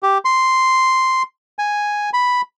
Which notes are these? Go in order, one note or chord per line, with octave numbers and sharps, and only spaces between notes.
G4
C6
G#5
B5